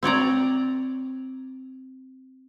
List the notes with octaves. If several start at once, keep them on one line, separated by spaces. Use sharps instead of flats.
C4 C#5 D5 A#5